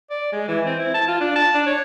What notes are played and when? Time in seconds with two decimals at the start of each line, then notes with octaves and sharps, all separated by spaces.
0.10 D5
0.32 G#3
0.48 E3
0.66 C4
0.79 E4
0.94 A5
1.08 F4
1.21 D4
1.36 A5
1.54 D4
1.66 C#5